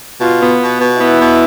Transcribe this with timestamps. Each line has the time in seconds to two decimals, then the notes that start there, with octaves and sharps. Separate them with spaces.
0.21 B2 F4
0.40 B3
0.60 B2
0.80 B2
0.99 B3 E4
1.20 B2